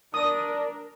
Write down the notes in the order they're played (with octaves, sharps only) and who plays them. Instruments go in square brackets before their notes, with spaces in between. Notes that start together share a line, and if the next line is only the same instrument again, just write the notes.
[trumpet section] D4 D5 [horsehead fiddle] A#4 [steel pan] D#6